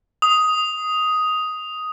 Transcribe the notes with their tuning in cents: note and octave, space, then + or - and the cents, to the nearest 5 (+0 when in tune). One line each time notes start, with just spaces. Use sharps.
D#6 +5